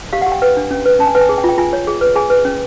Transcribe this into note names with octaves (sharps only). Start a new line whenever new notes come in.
G4 F5
F#5
G4
G5
B4 G5
D4
C#4
B4
C#4 A5
G#5
B4 G5
G#5
G#4
G5
F4
G5
F4 G#5
C#5
G#4
B4
G#4 G#5
B4
C#4